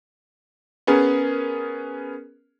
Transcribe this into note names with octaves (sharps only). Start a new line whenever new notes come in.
B3 C#4 G#4 A#4